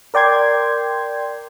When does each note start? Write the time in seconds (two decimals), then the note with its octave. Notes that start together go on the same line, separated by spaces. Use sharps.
0.14 A#4 D5 G5 C6 G#6